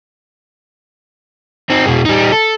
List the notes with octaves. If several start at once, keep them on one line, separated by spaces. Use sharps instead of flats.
C4 D#4
B2 G#3
G3 D#4
A4